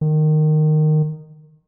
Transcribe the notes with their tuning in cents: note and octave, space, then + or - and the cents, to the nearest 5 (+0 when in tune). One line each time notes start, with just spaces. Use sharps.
D#3 -15